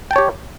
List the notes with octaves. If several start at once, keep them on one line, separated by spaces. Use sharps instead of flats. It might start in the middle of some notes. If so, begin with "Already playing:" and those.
G4 C#5 G5 A5